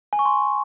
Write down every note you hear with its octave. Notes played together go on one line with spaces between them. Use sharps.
G#5
C#6
C6